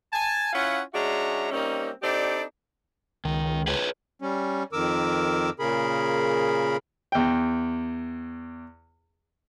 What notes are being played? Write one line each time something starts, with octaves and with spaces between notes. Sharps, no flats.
G#5 A5
C#4 E4 F4 F5 F#5
G#3 C#4 D4 F#4 E5 A#5
G3 A#3 C4 C#4 D#4
C4 D4 D#4 G4 A4 D5
C#2 D#3
G#4 B4 C#5
G3 C#4
F2 D#3 A#4 D6 E6
A#2 C#3 G#4 A#4 B5
E2 G5